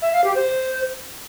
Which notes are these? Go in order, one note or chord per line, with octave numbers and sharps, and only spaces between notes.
E5
F5
G4
C5